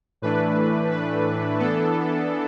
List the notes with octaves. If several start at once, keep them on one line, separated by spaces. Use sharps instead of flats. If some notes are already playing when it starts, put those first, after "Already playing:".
A2 E3 A3 D4 B4
B4
E3 B3 D4 A4